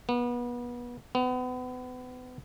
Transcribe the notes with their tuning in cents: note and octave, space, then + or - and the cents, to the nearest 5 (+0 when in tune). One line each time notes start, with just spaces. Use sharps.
B3 -30
B3 +30